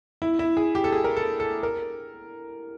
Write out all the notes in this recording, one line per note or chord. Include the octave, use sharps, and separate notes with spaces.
E4
E4
G#4
G4
A4
G#4
A#4
A4
A4
A#4